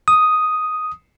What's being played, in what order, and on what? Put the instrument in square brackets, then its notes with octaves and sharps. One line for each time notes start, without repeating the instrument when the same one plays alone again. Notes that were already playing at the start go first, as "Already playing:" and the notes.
[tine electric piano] D#6